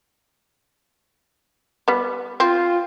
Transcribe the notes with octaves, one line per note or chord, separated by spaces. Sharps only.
G3 B3
C4 F4